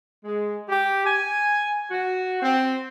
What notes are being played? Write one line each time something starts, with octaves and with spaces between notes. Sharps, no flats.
G#3
G4
G#5
F#4
C4